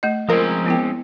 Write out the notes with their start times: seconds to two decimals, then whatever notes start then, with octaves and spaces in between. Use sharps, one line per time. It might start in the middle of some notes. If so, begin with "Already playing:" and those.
0.03 A3 D#5
0.29 F3 G#3 C4 C#4 A#4
0.66 B3 E4 G5